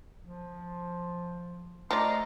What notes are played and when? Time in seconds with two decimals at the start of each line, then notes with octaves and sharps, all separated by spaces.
0.23 F3
1.91 F3 A3 D5 D#5 A#5 C6